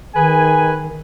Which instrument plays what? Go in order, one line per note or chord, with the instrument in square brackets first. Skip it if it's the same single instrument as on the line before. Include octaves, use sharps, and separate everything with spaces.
[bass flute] D#3 [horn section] G#4 B4 G#5